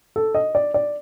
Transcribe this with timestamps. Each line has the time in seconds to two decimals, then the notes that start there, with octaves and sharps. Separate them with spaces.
0.16 A4
0.35 D#5
0.55 D5
0.74 D5